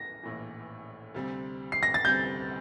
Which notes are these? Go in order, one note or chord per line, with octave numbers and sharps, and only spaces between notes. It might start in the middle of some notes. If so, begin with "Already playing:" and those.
Already playing: A#6
A#1 A2 E3
D2 C3 G3 C4
C7
A#6
A6
D2 C3 G3 C4 G6